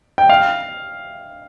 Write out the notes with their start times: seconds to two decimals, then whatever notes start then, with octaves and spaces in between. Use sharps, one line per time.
0.18 G5
0.29 F5